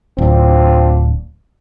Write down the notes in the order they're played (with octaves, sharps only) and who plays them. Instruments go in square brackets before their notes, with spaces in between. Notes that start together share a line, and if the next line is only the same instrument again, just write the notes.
[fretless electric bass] D1 [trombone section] C4 D4 F4